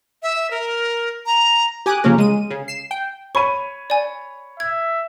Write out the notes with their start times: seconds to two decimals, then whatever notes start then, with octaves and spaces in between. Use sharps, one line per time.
0.23 E5
0.51 A#4
1.26 A#5
1.86 G4 G#5 D6 D#6 F#6
2.04 C#3 F3 A#3 C#4 A#4
2.18 G#3 D#7
2.51 C#3
2.68 C7 E7
2.91 G5
3.35 C#5 B5 C#6 D#7
3.90 D5 G#5
4.60 E5 G#6